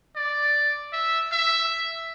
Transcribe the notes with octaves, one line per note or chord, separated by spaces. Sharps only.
D5
E5
E5